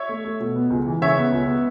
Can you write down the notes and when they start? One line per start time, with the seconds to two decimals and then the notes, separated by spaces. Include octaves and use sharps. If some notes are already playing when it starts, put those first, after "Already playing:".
Already playing: C#5 E5
0.09 A3
0.25 A3
0.40 B2
0.56 B3
0.70 C#2
0.86 E3
1.01 C#3 C#5 E5
1.16 B3
1.32 C#2
1.47 B3